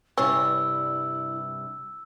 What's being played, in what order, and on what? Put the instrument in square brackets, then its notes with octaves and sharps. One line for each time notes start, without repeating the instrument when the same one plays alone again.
[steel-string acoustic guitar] G2 C3 G3 [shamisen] C#4 [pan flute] E4 [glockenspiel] E6